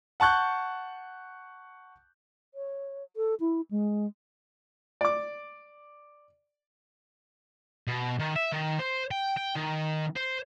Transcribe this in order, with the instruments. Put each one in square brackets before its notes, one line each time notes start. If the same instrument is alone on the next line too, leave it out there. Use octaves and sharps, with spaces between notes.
[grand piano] F#5 A5 C#6 F#6 G6
[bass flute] C#5
A4
E4
G#3
[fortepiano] D5 D6
[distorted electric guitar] B2
D#3
E5
D#3
C5
G5
G5
D#3
C5